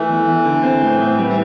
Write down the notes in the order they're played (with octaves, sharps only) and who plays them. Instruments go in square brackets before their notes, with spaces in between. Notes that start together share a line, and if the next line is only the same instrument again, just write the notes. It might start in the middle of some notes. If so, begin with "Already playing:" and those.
Already playing: [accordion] E3 [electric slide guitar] A3
[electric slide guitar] E2
E2
D3
C4
A2
A2
G3
[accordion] E3